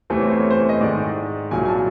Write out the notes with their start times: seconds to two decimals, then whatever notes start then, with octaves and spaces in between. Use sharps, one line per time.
0.10 E2 C3 E3 A3 C5
0.20 C#5
0.30 C5
0.40 C#5
0.51 C5
0.69 D#5
0.81 G#2 D#3 G#3 D5
1.51 C2 A#2 F#3 G#5
1.65 G#5
1.68 A5